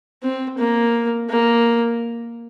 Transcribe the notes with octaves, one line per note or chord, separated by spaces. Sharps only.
C4
A#3
A#3